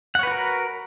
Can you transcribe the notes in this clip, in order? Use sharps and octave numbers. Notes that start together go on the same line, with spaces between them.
F#4 A#4 B4 C#5 F#5